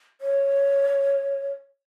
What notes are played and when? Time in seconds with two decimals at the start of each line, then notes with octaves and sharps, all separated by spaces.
0.21 C#5